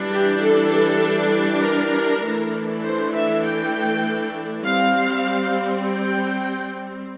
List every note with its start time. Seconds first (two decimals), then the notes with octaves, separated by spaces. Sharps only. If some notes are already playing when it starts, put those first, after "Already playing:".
Already playing: E3 G3 D4
0.11 G4
0.41 A4
1.62 A#4
2.23 E3 A3 D4
2.83 C5
3.13 E5
3.44 G5
4.64 G3 C4 F5
5.86 G5